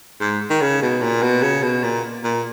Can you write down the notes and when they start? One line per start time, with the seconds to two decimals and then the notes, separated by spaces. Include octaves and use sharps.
0.21 G#2
0.50 D#3
0.61 C#3
0.82 B2
1.02 A#2
1.22 B2
1.42 C#3
1.63 B2
1.84 A#2
2.24 A#2